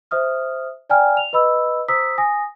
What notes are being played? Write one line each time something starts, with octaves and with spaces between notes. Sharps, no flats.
C5 E5 D#6 F6
D5 G5 G#5 A#5 F6
F7
B4 D#5 B5 E6
C5 A#5 D#6 E6 B6
G#5 D#6 A#6